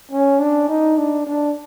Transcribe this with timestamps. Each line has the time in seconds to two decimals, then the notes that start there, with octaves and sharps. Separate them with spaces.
0.11 C#4
0.39 D4
0.68 D#4
0.98 D4
1.27 D4